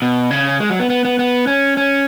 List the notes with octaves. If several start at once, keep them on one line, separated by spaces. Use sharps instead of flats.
B2
C#3
G#3
F#3
B3
B3
B3
B3
C#4
C#4